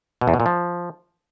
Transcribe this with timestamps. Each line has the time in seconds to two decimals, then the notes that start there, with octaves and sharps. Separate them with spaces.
0.21 B2
0.28 E2
0.34 B2
0.40 A#2
0.46 F3